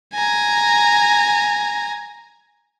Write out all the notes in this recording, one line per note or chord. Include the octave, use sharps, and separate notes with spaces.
G#5 A#5